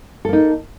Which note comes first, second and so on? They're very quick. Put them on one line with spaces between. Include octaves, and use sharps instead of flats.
A4 A#3 D#4